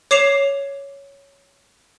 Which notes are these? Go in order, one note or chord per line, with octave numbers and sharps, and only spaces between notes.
C#5 D6 C7 E7 F7